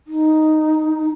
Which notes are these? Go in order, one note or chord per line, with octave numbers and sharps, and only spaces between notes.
D#4